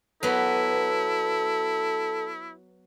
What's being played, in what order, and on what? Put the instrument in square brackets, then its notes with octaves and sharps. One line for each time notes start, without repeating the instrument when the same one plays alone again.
[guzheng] F#3 B3 [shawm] E4 [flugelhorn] A4